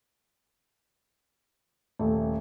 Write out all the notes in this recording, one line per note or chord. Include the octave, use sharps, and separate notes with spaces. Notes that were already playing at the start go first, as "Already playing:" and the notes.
D#1 A3